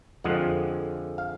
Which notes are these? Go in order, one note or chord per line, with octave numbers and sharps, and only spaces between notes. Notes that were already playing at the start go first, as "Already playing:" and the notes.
F2 D3 F3 G#3 F#5
F5